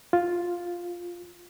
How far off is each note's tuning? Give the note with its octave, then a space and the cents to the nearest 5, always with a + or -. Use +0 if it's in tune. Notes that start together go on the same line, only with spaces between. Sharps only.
F4 +5